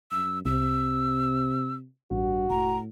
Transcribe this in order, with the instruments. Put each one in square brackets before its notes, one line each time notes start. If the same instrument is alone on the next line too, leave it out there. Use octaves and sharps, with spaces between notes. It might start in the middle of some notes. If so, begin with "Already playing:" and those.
[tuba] F#2 [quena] E6
[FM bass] C2 [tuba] C3 [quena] E6
[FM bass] A1 [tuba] G2 [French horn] F#4
[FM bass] E1 [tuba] A2 [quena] A#5